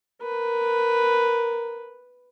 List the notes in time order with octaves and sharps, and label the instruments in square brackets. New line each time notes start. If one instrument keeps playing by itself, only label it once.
[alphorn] A#4 [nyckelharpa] B4